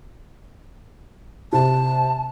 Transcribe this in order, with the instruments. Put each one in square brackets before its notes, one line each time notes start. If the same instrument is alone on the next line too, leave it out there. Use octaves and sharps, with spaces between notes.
[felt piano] C3 [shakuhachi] A5